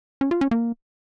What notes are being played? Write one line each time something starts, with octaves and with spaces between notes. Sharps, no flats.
C#4
F4
C#4
A#3